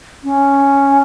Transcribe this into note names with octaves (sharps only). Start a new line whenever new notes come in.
C#4